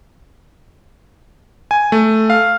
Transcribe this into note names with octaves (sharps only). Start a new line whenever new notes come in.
G#5
A3
F5